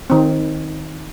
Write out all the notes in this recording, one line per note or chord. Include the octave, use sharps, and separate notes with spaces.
D#3 C4